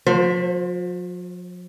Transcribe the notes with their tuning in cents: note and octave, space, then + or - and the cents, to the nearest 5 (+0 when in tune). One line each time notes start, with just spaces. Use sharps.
F3 +45 C5 +0